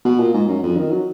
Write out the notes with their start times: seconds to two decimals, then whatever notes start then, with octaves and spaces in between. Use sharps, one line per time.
0.05 B2
0.19 A#2
0.34 G#2
0.48 F#2
0.63 F2
0.77 D#3
0.91 F#3